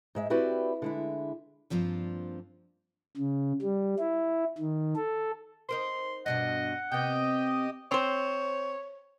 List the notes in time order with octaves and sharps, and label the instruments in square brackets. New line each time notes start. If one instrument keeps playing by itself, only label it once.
[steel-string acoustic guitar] G#2 G#3 E5
C4 E4 F#4 G4 B4 D5
D3 G#3 E4
G2 F3 A#3 C4 D4 F4
[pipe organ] C#3
G3
E4
D#3
A4
[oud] D#4 A#4 C5 [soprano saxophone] C6
[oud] G2 B2 D4 [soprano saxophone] D#5 [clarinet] F#5
[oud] C3 B3 [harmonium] G4 D#5 [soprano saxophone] G5
[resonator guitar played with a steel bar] C4 C5 [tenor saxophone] C#5